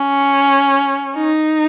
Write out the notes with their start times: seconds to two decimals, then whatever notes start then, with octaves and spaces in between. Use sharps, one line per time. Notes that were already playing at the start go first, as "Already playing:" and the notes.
Already playing: C#4
1.16 D#4